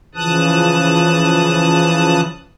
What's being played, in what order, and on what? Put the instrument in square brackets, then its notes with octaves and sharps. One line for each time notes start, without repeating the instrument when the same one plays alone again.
[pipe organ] C#3 E3 F3 A5 D#6 F#6